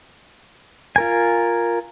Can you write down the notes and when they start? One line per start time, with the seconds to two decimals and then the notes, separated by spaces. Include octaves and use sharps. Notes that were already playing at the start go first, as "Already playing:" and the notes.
0.96 F4 A#4 G#5